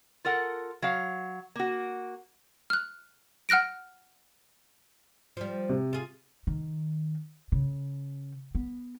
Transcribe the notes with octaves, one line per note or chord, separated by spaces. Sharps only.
F4 A4 A#4 F#5
F#3 F5
A#3 F#4
F6 F#6
F#5 F6 F#6 A#6 D7
F3 G3
C3
F4 G#4
D#3
C#3
B3